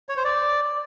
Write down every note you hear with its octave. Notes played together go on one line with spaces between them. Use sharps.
C#5
C5
D5